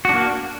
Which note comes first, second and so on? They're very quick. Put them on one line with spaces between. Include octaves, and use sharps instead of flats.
F#4 D4 A#3